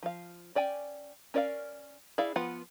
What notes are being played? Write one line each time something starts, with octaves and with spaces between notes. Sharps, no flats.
F3 F5
C#4 D5 G5 G#5
C#4 A#4 D5 D#5 F5
E4 G#4 D5 F5
F3 B3 F4 F#5 B5